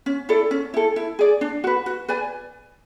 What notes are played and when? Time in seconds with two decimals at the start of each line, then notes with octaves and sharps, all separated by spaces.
0.06 C#4
0.29 E4 A4 D5
0.51 C#4
0.74 E4 A4
0.96 E4
1.19 G#4 D5
1.41 D4
1.64 F#4 B4
1.86 F#4
2.08 B4 D5 G#5